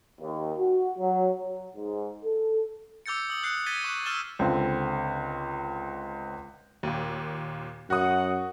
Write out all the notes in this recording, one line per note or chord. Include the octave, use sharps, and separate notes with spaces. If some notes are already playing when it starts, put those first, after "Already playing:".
D#2
F#4
F#3
F#3
G#2
A4
D6 E6 G6 A6 C#7
D#6 F#7
D#6 F#6 C7 C#7
G#6 A6 B6 D#7 G7
C#6 F#6
E6 F6 A6 E7 G7
C#2 D3 C4
D#2 A#2
F#2 F#4 F#5 D#6